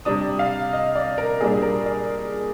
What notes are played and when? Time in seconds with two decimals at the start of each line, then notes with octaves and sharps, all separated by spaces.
0.05 C3 G3 D4 D#6
0.39 F5
0.73 D#5
0.95 D5
1.18 A#4
1.41 A#2 G3 D4 G#4
1.62 A#4
1.86 D5